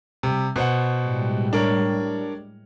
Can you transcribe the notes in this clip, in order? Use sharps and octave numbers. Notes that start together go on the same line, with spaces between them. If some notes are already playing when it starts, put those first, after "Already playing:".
C3 G3
B2 C5 F#5
A2 G3 G#3
D4 A#4 C#5